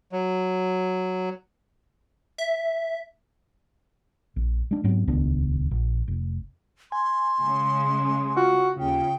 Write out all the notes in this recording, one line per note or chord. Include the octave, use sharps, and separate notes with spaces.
F#3
E5
A#1
G#3 D4
G#2 F#3 B3 C4
D#1 C#2 B3 D4
A#1
F1
G#5 C6
C#3 G#3
F4 F#4
D#2 C#3 G5